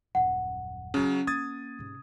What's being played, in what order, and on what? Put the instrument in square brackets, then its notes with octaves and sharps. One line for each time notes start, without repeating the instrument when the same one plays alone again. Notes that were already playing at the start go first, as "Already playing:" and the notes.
[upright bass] D#1 F#2 [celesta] F#5
[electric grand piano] C#3 F#3 [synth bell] C#4
[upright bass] A#3 [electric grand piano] D#6 G#6 A6
[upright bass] G#2 C3